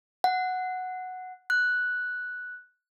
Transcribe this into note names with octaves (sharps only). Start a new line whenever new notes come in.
F#5
F#6